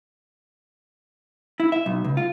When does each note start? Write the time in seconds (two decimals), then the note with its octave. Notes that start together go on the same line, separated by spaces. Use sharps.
1.60 E4
1.72 E5
1.86 B1
2.04 C#2
2.17 F4